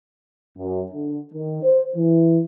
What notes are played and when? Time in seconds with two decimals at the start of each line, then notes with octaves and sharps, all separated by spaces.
0.57 F#2
0.91 D3
1.33 D#3
1.63 C5
1.95 E3